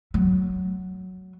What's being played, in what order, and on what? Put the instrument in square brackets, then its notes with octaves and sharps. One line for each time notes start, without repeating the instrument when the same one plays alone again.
[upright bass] F#3